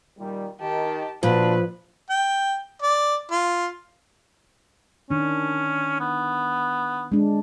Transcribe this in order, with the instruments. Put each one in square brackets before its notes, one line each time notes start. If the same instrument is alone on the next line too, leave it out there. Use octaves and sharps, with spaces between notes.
[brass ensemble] A#2 D#3 G3
[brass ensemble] D#3 [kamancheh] G4 A5
[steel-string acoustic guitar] A#2 [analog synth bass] F3 [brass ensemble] D4 F#4 [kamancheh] B4
[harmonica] G5
D5
F4
[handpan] D#3 D4 [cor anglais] C#4
[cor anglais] B3
[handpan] G#3 D4